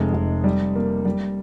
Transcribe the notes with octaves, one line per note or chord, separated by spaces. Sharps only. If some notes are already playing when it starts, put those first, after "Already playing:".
Already playing: F1 G#3
F1
G3
A#3
G3